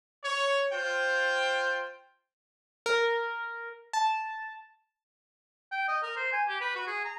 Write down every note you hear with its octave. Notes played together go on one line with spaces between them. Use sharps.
C#5
F4 C5 G5
A#4
A5
G5
D#5
A#4
C5
G#5
G4
B4
F#4
G#4
A#5